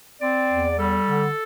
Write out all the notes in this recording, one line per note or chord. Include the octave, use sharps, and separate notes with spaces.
C4 D5
E2
G3 A4
D3